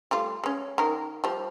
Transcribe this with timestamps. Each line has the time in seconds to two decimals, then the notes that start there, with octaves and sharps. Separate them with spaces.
0.11 G3 A3 F4
0.44 G#3 C#4
0.78 D#3 A#4
1.24 F3 G3